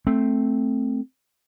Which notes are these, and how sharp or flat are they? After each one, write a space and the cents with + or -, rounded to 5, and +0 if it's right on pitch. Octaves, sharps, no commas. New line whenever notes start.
A3 +0 C4 +0